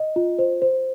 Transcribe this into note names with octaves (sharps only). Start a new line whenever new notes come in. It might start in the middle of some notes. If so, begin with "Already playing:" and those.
Already playing: D#5
F4
C5
C5